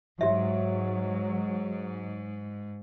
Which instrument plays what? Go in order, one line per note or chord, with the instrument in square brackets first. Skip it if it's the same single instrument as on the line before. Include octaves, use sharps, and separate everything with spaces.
[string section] G#2 [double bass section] F#3 [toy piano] G4 E5